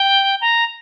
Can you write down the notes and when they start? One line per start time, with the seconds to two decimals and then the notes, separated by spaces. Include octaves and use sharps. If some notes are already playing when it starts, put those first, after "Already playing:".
Already playing: G5
0.41 A#5